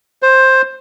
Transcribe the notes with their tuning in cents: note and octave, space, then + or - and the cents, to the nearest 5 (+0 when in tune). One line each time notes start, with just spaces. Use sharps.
C5 +10